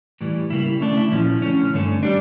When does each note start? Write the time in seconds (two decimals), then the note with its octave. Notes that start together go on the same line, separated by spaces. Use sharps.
0.21 A2 E3 G3
0.50 C#3 G3 A#3 E4
0.81 D3 A3 C#4 D4
0.97 E4
1.11 A#2 F3 C#4 E4
1.42 D3 A3 C#4
1.73 G2 D3 A3 C#4
2.03 G3 D4